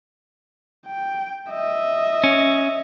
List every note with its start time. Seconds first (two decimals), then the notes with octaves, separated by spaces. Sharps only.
0.86 G5
1.51 D#5 E5
2.24 C#4